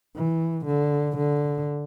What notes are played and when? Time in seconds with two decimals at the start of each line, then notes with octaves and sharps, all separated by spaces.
0.16 E3
0.66 D3
1.17 D3